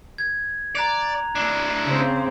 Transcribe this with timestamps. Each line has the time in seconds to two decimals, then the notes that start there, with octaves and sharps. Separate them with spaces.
0.18 G#6
0.75 D5 A#5 F#6 F7
1.35 D4 E4 D6 C7
1.85 C#3 C4